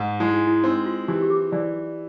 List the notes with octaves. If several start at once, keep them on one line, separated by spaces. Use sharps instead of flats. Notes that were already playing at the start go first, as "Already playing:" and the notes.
Already playing: G#2
G#3 E4
D#4
E4
C4 D#4
F4
E3 G4
G4
G#4
E3 D5